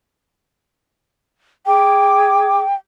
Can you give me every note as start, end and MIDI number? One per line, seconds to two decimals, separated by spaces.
1.66 2.61 68
1.66 2.75 79
1.66 2.61 86